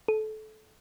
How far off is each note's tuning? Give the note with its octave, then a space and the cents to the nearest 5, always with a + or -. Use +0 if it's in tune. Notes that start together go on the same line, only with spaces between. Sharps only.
A4 -25